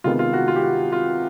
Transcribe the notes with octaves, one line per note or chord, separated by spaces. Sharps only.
C3 D#3 G#3 B3 F4
F4
F#4
F4
G4
F#4
F4